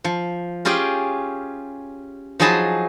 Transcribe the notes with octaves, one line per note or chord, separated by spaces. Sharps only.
F3
C#4 F4 G4 G#4 G5
F3 F#3 D#4 G#4 A5 B5